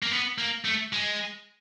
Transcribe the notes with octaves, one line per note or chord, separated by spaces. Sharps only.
A#3
B3
A#3
A3
G#3